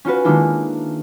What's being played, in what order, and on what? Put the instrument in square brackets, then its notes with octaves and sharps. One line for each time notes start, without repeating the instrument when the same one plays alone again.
[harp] C#4 F4 F#4 B4
D#3 G#3 A#3 D4 E4 F4